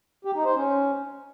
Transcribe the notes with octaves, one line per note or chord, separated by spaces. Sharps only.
G4
D#4
C5
C#4